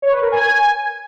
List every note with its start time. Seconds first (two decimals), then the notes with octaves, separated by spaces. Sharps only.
0.02 C#5
0.12 B4
0.22 A#4
0.32 G#5